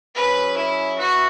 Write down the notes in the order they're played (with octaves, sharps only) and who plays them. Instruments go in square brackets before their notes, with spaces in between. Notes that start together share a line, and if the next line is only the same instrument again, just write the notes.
[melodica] F#3 C#4 G#4 [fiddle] B4
[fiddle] E4
[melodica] E4 B4 E5 [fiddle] F#4